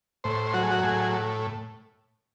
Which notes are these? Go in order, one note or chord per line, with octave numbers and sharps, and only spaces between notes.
A2 C5
F#3 F#4
G#4
F#4
A2 G#4